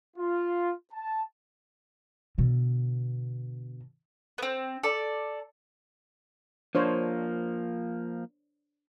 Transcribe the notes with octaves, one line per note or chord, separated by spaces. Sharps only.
F4
A5
B2 D3
B3 C4
A4 D5
F3 A#3 D4 C5 C#5